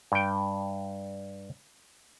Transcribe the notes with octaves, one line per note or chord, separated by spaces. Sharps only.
G2 G5